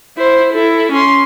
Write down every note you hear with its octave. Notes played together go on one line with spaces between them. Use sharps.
E4 C5
E4 A4
C#4 C6